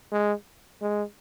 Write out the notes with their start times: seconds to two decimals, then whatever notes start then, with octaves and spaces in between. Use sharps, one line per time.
0.12 G#3
0.82 G#3